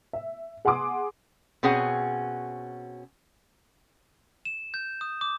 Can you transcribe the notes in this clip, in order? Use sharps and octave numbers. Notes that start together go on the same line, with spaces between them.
E5
G#4 F#5 G#5 C6 D6 D#6
B2 C4 C#4 G#4 F#5
E7
G6
D#6
D6